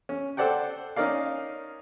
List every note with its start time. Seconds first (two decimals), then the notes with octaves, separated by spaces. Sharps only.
0.09 C#4
0.37 A4 C5 D5 F#5 G5
0.96 C#4 D#4 A#4 D5 F5